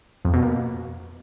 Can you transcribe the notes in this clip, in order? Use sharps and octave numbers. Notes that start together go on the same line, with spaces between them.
F2
B2
A#3